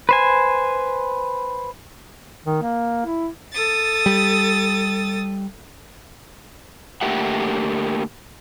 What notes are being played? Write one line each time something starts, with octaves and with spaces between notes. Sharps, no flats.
B4 C5 G#5
D#3
A#3
E4
A4 D#6 A6
G3
D3 A3 A#3 G4 E5 F#5